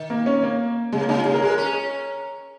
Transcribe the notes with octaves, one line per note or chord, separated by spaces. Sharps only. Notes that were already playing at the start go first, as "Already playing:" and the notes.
Already playing: D#3
A#3
C#4
A#3
C#3 G#3
A#3
C#3 D#4
F4
C#3 G#4
A#3 A#4
G#3 G#4
A#4
C#4